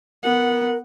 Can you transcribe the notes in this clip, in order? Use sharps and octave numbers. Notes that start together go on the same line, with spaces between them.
B3 A#4 F#5